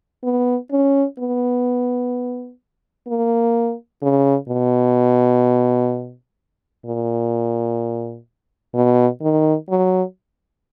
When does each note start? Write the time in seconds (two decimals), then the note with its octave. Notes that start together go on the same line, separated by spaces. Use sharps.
0.24 B3
0.72 C#4
1.19 B3
3.08 A#3
4.02 C#3
4.49 B2
6.86 A#2
8.74 B2
9.22 D#3
9.70 F#3